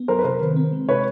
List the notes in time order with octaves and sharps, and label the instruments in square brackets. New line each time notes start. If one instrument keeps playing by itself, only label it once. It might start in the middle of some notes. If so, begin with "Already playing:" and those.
Already playing: [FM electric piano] B3
[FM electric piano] F#3 [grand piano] A#4 C5
[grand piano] B4
[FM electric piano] C3 [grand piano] A#4 C5
[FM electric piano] D#3
C4
G#3
[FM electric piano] C3 [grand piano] B4 C#5